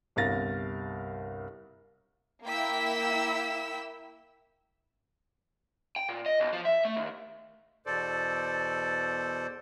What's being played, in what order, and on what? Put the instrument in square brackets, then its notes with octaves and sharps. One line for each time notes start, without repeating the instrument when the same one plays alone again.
[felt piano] G1 C2 A#4 F5 A6 A#6
[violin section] A#3 E4 G5 E6 B6
[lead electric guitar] G5
A#2
D#5
B1
F3
E5
A3
D#2
[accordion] E2 B2 A4 C5 D5